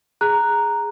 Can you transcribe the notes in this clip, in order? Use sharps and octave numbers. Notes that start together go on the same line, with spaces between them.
G#4 A#5 F#6